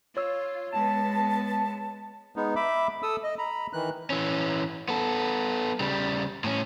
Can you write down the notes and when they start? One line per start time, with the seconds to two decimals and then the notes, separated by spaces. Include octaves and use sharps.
0.17 F4 C#5 E6
0.73 G#3 B3 A5
2.36 G#3 B3 D#4
2.56 E5 B5 D6
3.03 A4 D#6 E6
3.23 D#5
3.38 A#5 B5
3.73 D#3 E3 F#6
4.10 E3 C#4
4.89 B3 A4
5.80 C#3 G3
6.44 A2 C#4